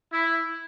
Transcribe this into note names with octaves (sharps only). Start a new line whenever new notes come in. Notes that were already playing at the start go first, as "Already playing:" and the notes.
E4